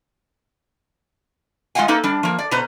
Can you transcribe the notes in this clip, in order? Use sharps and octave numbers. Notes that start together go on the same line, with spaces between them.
G#3 F4 D#5 F5 F#5 G#5
A#3 D#4 A4 B4
G3 D4
F3 A#3
D5
B2 B4 C5 A#5